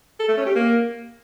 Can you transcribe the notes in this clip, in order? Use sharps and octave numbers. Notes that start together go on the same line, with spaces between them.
A4
A3
C#4
G4
A#3